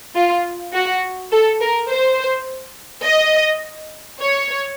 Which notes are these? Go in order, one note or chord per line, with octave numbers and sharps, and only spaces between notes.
F4
F#4
A4
A#4
C5
D#5
C#5